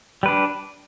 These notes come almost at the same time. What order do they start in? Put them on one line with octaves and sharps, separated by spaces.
G3 B4 D4